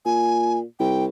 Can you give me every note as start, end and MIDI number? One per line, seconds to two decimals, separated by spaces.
0.05 0.61 46
0.05 0.59 80
0.80 1.07 36
0.80 1.04 79